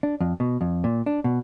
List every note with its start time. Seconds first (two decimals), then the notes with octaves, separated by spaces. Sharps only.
0.03 D4
0.21 F2
0.40 B2
0.61 F2
0.84 A#2
1.06 D4
1.24 B2